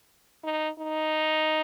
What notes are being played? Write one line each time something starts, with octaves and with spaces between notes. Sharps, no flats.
D#4
D#4